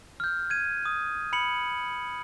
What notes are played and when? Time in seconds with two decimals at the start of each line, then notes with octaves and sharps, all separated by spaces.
0.20 F6 G6
0.50 G#6 D#7
0.85 D#6
1.33 B5 C#7 F#7